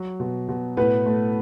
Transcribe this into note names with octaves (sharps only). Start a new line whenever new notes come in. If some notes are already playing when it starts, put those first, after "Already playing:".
Already playing: F#3
B2
B2
A2 B3 B4
A3